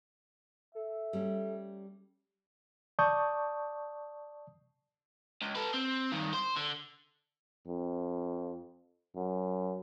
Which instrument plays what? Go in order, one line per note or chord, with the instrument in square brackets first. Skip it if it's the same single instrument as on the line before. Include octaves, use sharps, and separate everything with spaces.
[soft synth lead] A4 [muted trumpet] E5
[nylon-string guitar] G3 A3 C#4
[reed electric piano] D5 A5 C#6 D#6 G6
[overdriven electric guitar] C#2
A4 B4
C4
G2 D#3
C5
D3
[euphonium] F2
F#2